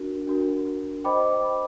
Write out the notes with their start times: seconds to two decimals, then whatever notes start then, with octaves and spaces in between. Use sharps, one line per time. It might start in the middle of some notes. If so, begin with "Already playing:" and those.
Already playing: D4 F#4 A#4
0.27 D4 F#4 A#4
1.04 C5 D#5 G5 B5 D6